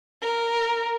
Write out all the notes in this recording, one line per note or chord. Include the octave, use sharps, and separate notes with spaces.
A#4